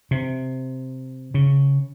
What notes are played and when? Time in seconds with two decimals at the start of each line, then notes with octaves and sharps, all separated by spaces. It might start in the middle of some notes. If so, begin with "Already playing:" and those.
0.11 C3
1.34 C#3